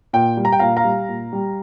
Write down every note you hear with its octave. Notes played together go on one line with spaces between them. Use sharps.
A#2 G5
G3
A#5
G5
A#2 F5 A#5
F5 A#5
G3
A#2
G3